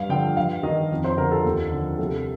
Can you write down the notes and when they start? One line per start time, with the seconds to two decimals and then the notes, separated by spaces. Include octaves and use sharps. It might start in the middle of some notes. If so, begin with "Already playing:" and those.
Already playing: G2 F5
0.09 D3 F3 G5
0.37 G2 F5
0.63 D#3 D#5
0.91 F2
1.04 C5
1.17 D3 F3 A#4
1.31 A4
1.44 D#2
1.72 D3 F3
1.98 C2 A4